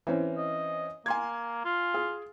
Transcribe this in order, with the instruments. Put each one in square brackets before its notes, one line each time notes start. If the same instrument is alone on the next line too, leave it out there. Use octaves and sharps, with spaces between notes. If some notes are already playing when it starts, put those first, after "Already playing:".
[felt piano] E3 C4 C#4
[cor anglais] D#5
[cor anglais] A#3 [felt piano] G#5 C6 G#6
[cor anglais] F4
[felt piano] G#4